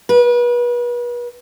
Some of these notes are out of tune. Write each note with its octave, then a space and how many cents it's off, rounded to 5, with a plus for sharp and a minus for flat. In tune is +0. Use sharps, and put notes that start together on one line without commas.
B4 -35